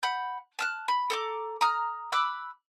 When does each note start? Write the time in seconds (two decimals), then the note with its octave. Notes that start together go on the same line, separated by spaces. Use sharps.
0.03 F#5 B5 G6
0.59 A5 F6 F#6
0.88 B5
1.10 A4 A#5 D6
1.61 A#5 D#6 F6
2.12 B5 D6 E6 F#6